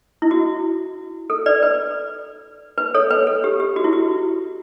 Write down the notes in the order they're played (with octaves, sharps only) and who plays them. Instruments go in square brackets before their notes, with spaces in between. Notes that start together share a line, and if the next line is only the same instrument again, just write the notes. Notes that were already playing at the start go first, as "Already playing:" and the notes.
[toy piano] E4
F#4
A4
B4 D5
B4
B4
A4 C#5
B4
A4
G4
G4
F#4
E4
F#4